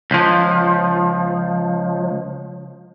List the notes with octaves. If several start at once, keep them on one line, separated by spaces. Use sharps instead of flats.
C#2 F3